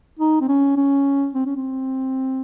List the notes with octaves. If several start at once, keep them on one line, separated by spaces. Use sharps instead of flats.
D#4
C4
C#4
C#4
C4
C#4
C4